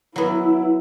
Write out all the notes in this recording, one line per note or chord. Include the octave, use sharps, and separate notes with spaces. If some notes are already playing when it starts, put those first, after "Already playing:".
F#3 B3 E4